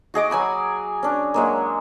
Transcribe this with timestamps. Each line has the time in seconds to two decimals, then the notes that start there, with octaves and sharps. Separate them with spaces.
0.14 F#4 G#4 D#5 D6
0.30 F#3 G#5 B5 E6
1.03 C#4 D4
1.34 F#3 G#3 A#3